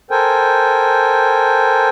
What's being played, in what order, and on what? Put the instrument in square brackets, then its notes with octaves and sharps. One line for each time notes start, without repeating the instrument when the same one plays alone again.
[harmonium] A4 A#4 C5 G5 G#5